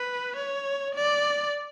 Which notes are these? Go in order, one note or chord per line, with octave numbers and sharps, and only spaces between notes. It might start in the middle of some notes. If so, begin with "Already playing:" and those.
Already playing: B4
C#5
D5